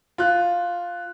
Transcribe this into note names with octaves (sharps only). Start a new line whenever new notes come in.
F4 F#6